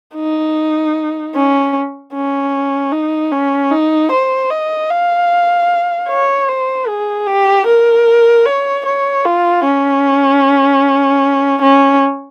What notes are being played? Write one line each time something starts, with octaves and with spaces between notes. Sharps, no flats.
D#4
C#4
C#4
D#4
C#4
D#4
C5
D#5
F5
C#5
C5
G#4
G4
A#4
C#5
C#5
F4
C#4
C#4